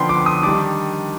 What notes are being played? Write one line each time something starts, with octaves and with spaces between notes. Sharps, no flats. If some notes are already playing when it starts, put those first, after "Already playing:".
Already playing: D3 F3 B3 D4 G5 B5 C6
D6
D#6
D#3 G3 D4 D6